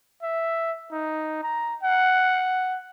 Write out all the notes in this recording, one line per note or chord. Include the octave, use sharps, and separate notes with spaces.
E5
D#4
A#5
F#5